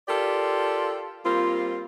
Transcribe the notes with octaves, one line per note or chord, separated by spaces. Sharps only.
F4 G4 A4 A#4 D5
G3 A#3 C4 F4